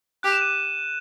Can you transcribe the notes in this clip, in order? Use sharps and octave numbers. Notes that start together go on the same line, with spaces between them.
G4 F#6
E7
D#7